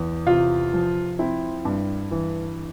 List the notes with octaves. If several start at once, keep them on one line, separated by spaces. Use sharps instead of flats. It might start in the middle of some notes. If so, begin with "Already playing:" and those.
Already playing: E2
C3 F4
F3
C4 E4
G2
E3